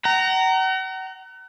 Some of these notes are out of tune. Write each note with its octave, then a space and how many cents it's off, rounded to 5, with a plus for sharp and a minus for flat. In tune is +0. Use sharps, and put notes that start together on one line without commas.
F#5 +40 A#5 -10